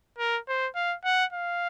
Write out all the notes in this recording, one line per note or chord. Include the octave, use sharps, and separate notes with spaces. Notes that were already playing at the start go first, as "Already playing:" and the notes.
A#4
C5
F5
F#5
F5